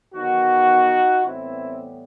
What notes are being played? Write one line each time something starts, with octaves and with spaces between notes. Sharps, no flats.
E2 D#3 F#3 B3 D#4 F#4
A2 E3 G3 B3 C4 E4